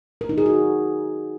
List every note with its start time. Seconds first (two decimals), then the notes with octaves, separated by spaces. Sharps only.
0.21 A#4
0.29 D#4
0.38 G#4
0.46 F#4